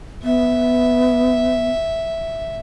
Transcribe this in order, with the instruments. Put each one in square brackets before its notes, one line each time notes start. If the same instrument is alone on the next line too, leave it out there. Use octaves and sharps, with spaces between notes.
[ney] B3 [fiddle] E5